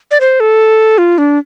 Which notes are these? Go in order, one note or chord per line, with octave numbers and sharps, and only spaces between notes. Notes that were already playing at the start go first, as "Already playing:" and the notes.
D5
C5
A4
F4
D4